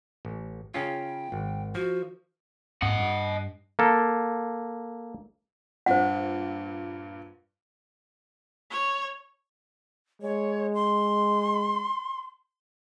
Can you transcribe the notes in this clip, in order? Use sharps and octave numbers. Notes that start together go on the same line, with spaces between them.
A1
C#3 C#4 F4 G5
G#1
F3 F#4
G#2 C4 D#5 F#5
G2
A#3 A4
G2 A#2 C5 F#5
C#5
G#3 C#5
C6